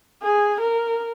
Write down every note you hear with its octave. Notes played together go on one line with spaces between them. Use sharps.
G#4
A#4